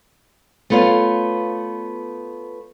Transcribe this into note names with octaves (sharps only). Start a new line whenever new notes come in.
A3 B3 F4 C#5 F5